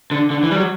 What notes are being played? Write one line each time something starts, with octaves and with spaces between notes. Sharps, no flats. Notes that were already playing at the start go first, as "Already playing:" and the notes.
D3
D3
E3
G3
F#3